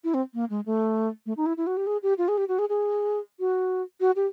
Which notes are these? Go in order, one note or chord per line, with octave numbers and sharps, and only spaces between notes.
E4
C4
A#3
G#3
A3
A3
D#4
E4
E4
F#4
G4
G#4
G4
F4
G#4
G4
F#4
G#4
G#4
F#4
F#4
G4